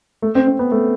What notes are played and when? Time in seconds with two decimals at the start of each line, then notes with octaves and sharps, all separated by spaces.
0.22 A3
0.35 C4
0.47 C4
0.59 B3
0.71 A3